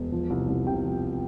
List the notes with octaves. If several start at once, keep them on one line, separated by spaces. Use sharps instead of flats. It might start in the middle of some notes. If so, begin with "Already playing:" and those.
Already playing: E1
F3
C2
C2
C3 G5
F3